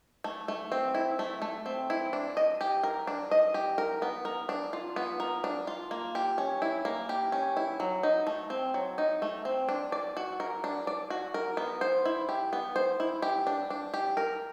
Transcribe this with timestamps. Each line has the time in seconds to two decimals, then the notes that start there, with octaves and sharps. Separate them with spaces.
0.24 A3
0.48 A3
0.72 C4
0.95 E4
1.19 A3
1.42 A3
1.66 C4
1.90 E4
2.13 D4
2.37 D#5
2.61 G4
2.84 A#4
3.07 D4
3.31 D#5
3.54 G4
3.78 A#4
4.02 B3
4.25 A#4
4.49 D4
4.73 F4
4.96 B3
5.20 A#4
5.44 D4
5.67 F4
5.91 A#3
6.15 G4
6.38 C#4
6.62 E4
6.85 A#3
7.09 G4
7.32 C#4
7.57 E4
7.80 F#3
8.03 D#4
8.27 A3
8.50 C4
8.74 F#3
8.98 D#4
9.22 A3
9.45 C4
9.69 D4
9.92 D5
10.17 F#4
10.40 A#4
10.64 D4
10.87 D5
11.10 F#4
11.34 A#4
11.57 B3
11.81 C5
12.05 E4
12.29 G4
12.53 B3
12.76 C5
13.00 E4
13.22 G4
13.47 D4
13.70 D4
13.94 G4
14.17 A#4